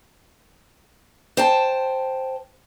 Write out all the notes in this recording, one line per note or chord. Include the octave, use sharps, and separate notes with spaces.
C5 G5 A5